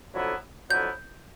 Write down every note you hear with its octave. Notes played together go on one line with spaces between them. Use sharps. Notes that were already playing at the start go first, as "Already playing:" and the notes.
F2 D3 F#3 B3 E4
F2 D3 F#3 B3 E4 G6